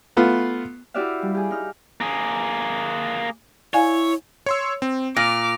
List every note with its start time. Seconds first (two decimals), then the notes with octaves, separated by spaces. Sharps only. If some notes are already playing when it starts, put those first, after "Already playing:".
0.17 A3 B3 F4
0.94 E4 F#4 G4 D5 E5 F5
1.22 G3
1.34 G4 G#4
1.51 D#4 F6
2.01 A#3 G#4
3.74 E4 C#5 D5 F5 G#5
4.46 C#5 C6 E6
4.82 C4
5.16 A#2 D6 F6 A#6 D7